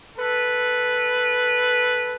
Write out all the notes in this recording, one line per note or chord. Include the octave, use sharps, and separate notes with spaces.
A4 B4